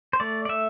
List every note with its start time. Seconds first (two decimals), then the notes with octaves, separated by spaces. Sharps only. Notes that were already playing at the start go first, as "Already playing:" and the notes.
0.13 C5
0.20 A3 D5
0.45 D5
0.49 A3 E5